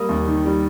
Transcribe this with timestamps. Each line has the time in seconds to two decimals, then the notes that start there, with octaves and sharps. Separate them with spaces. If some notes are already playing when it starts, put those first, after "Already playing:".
Already playing: G3 A#3 D#6
0.09 D#2
0.27 D#3
0.45 G3